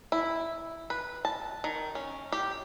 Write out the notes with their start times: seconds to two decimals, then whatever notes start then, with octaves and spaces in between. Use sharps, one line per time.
0.12 E4
0.90 B4
1.25 A5
1.64 D#3
1.95 C#4
2.32 G4